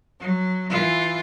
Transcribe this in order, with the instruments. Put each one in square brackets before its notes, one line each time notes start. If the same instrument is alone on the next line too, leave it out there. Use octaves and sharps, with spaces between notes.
[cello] F#3
E3 F4